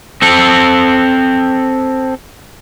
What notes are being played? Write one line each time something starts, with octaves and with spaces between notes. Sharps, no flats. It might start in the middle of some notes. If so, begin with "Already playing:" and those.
C4 A4